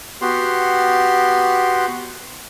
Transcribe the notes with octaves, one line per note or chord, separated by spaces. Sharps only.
B3 F#4 G4 C6